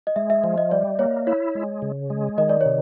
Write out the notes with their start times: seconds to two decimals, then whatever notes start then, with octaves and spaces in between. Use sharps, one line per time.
0.07 D#5
0.16 G#3 E5
0.30 E5
0.44 F3
0.58 D#5
0.71 G3 D5
0.99 A#3 C#5
1.27 E4 C#5
1.55 G#3
1.82 C#3
2.10 G#3
2.38 D#3 D#5
2.49 D5
2.61 C3 C#5